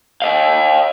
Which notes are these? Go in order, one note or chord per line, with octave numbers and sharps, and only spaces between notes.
D#5 F5